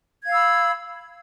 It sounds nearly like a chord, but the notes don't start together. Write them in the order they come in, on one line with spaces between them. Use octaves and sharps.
G#6 F5 E6 B5